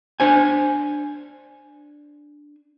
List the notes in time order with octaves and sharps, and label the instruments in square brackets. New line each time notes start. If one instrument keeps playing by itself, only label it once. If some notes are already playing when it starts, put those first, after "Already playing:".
[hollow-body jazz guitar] D4 C5 G#5